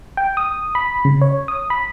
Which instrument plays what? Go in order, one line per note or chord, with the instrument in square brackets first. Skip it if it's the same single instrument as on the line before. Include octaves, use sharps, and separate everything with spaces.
[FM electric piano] G5
D#6
B5
C#3
C#5
D#6
B5